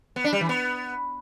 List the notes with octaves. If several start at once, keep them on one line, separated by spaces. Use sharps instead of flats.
B3
D4
G3
E3
B3